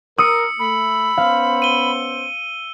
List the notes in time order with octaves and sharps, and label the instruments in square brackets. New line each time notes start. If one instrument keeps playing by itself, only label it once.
[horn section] A#4 [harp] D#6 [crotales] E6 C#7
[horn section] A3 [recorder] B5
[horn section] B3 C#4 C5 [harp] F5
[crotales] D#7 G7